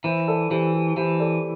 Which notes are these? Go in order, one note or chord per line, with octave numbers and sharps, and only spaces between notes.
E3 C5 E5
A4 D5
E3 G4 C5
G4
E3 G4 C5
A4 D5